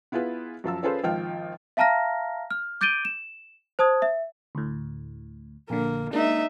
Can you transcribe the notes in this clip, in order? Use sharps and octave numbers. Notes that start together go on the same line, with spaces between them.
B3 E4 F4 G#4 B4
F#2 F3 A5 E6
C#4 F4 G#4 A4 B4 C5
G#1 F3 G5 F6
E5 F5 A5 A#5 F6 A#6
F6
D6 G6 A6 D7 D#7 G7
E7
C5 A5 D#6 G#6
E5
D2 A2
A#1 D3 A#3
G#3 A#3 D4 D#4 E5